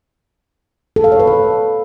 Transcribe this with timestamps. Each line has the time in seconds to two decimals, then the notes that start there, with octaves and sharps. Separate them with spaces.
0.96 A4
1.04 F5
1.12 C#5
1.20 B4
1.27 A4